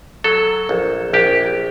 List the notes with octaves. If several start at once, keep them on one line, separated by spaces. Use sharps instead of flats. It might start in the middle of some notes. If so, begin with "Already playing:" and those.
F#3 A4
A#1
A#1 G4